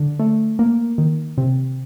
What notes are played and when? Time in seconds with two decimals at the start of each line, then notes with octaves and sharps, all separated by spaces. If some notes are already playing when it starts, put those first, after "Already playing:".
Already playing: D3
0.19 A3
0.59 A#3
0.98 D#3
1.38 C3